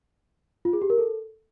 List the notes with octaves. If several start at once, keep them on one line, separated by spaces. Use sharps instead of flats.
F4
G#4
G4
A#4
A4